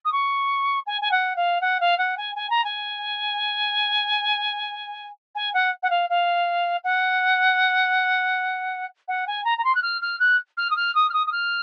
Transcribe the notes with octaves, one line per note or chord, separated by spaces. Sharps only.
D#6
C#6
G#5
G#5
F#5
F5
F#5
F5
F#5
G#5
G#5
A#5
G#5
G#5
F#5
F#5
F5
F5
F#5
F#5
G#5
A#5
A#5
C6
F#6
F6
F6
F#6
F6
D#6
F6
D#6
F6
D#6
D#6
F6